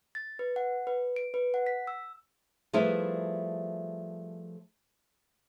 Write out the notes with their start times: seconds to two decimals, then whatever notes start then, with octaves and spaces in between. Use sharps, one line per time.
0.15 A6
0.39 B4
0.56 F#5
0.87 B4
1.16 D7
1.34 B4
1.54 F#5
1.66 B6
1.87 E6
2.73 F3 G3 A3 E4 G#4 B4